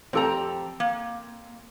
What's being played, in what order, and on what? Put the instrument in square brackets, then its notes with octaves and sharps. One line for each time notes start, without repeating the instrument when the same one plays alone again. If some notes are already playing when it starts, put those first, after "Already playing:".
[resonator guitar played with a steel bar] F2 G4 A#5 [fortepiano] C4 A4
[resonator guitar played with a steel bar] A#3